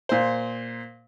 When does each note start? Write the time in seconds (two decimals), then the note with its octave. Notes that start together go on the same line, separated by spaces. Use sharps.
0.09 A#2 C5